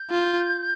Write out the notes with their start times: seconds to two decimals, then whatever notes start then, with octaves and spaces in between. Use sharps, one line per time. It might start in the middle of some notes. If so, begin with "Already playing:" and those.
Already playing: G6
0.10 F4